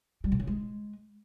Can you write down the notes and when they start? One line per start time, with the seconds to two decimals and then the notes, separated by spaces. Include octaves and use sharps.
0.24 G3
0.32 C3
0.40 C#3
0.47 G#3